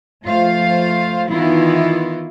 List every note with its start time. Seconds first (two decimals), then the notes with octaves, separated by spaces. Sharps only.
0.24 F3 A3 F4 C5 F5
1.29 D#3 E3 B3 E4 F4